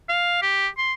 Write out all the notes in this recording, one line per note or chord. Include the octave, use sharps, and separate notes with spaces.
F5
G4
C6